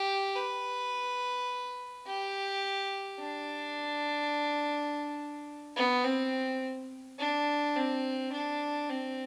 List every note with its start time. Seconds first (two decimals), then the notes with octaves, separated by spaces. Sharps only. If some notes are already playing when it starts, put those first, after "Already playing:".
Already playing: G4
0.36 B4
2.06 G4
3.20 D4
5.76 B3
6.05 C4
7.19 D4
7.76 C4
8.33 D4
8.90 C4